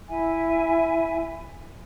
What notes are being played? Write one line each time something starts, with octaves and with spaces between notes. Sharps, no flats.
E4 E5 G#5